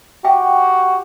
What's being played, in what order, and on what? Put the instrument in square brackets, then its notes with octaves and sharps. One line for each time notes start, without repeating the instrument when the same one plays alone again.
[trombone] F#4 [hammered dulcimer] G4 [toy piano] E5 G5